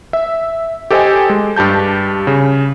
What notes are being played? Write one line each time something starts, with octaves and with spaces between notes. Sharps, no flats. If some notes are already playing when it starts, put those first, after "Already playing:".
E5
G4 A4 C5 D#5 G5 G#5
G#3
G2 G4 A5 G6
C#3